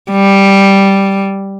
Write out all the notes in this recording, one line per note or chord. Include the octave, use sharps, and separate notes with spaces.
G3